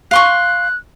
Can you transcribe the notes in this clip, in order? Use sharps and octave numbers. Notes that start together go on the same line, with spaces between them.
F5 C6 C#6 F#6